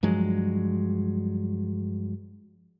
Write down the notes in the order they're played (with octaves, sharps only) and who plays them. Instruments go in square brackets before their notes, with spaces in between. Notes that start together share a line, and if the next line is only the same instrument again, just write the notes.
[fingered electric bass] G2 F3 F#3 G#3